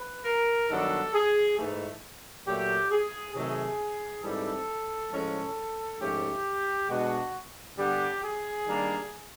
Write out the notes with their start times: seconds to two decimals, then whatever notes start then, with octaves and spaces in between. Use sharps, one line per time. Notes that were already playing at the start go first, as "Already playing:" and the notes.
Already playing: B4
0.25 A#4
0.70 G2 D#3 F#3 B3 D4 A4
1.14 G#4
1.58 G#2 E3 A3
2.47 A#2 F#3 A3 G4
2.91 G#4
3.35 C3 D#3 F#3 A3 G#4
4.24 G#2 E3 G3 C4 A4
5.12 A2 F3 G#3 C#4 A4
6.00 G#2 F3 A3 C#4 G4
6.89 B2 G#3 B3 D4 F#4
7.77 G2 D3 G3 B3 D4 G4
8.22 G#4
8.65 D#3 G3 A#3 D4